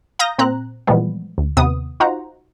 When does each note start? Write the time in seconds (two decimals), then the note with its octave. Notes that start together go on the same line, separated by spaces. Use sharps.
0.19 F5 A#5 D#6 G6 A#6
0.38 A#2 C4 A#5 F#6
0.87 A#2 E3 F3 G3 G#3 B3
1.38 D2
1.57 D#2 C3 B3 D#6
2.00 D#4 F4 F#4 C5 F#5 A#5